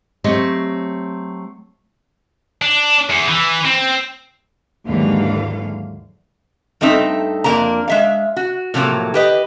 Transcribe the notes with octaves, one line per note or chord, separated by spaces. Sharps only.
F#3 A3 C4 G4 D#5
D4
E2
E3
C4
D#2 G#2 D3 E3 F#3 F5
G2 A3 C4 D#4 E5
F2 A#3 D4 A#5
G#3 E5 F5
F#4
A2 C3 F3 F#3 A#3
G4 B4 D#5